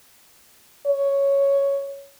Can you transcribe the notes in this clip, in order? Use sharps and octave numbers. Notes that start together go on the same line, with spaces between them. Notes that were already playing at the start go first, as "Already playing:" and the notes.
C#5